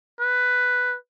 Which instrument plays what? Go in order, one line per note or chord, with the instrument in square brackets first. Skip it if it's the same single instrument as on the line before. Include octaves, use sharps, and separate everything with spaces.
[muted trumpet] B4